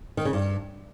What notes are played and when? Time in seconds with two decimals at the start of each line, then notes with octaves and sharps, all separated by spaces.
0.17 D#3
0.25 C#3
0.33 G2